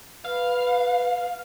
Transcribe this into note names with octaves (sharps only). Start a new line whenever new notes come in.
B4 F5